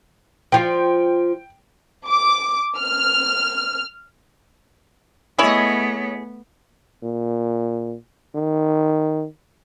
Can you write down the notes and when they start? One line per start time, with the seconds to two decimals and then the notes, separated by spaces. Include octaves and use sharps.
0.52 F3 F4 G5
2.06 D6
2.78 F6
5.38 A3 B3 E4 G#4 C#5 D#5
7.03 A#2
8.35 D#3